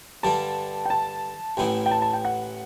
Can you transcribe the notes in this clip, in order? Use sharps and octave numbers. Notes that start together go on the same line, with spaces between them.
G2 D3 G3 D4 A5
G5
A5
A1 A2 E3 B3 E4 G5
G5
A5
A5
G5
F#5